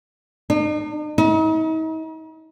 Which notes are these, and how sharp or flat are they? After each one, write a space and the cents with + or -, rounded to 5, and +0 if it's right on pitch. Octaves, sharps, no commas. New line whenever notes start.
D#4 -45
D#4 +40